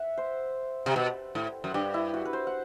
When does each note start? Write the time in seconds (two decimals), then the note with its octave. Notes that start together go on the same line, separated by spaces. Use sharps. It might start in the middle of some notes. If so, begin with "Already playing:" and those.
Already playing: E5 F#5
0.18 C5
0.86 C3
0.96 B2
1.35 A2
1.64 F#2
1.74 G2 G4
1.94 E4
2.14 F#4
2.25 B4
2.33 C5
2.47 F#5